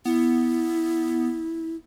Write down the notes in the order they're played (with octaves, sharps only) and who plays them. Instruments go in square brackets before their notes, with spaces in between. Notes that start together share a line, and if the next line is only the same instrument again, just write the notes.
[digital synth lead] B3 [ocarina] E4